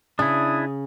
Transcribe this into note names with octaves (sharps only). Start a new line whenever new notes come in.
C#3 D4 E4 D#6